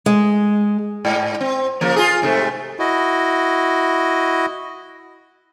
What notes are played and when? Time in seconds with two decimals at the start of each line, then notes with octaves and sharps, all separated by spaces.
0.06 G#3
1.05 G#2
1.41 C4
1.81 C#3 F3 A#3
1.96 F4 G#4
2.22 G#2 C3 A3
2.79 E4 F#4 D#5